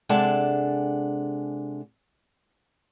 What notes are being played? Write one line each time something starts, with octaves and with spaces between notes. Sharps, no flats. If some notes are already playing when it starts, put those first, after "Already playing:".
C3 G#3 D4 A4 F#5 A5